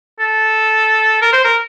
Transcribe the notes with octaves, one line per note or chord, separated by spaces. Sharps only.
A4
A#4
C5
A#4